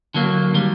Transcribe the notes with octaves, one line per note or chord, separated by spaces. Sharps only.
D3 F#3 A#3
D#3 G3